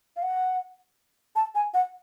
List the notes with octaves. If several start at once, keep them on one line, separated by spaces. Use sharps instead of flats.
F5
F#5
A5
G#5
F#5